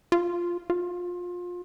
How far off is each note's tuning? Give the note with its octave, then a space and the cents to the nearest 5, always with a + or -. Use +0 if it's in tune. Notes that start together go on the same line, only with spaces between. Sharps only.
F4 +0
F4 +25